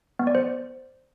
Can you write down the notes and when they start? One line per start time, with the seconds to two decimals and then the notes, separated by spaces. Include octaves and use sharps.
0.19 B3
0.27 D5
0.35 C5